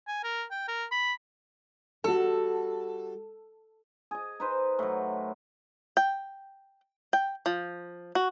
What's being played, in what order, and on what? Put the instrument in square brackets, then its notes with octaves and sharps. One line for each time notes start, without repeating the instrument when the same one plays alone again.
[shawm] G#5
A#4
G5
A#4
B5
[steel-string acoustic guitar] G3 F#4 [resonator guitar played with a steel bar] A4
[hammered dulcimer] G#4 D#5
D#4 B4 C5
A2 F#3
[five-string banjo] G5
G5
F3
F#4